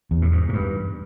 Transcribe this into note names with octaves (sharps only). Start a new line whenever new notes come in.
E2
A2
G#2
G#2
G2